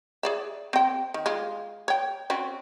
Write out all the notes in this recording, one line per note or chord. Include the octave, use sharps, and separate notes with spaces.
G#4 D5 E5
C4 G5
D#3
G#3 F4
C#5 G5
C4 C#4 F#4